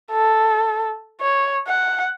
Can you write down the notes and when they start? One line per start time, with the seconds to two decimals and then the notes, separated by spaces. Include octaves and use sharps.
0.12 A4
1.21 C#5
1.68 F#5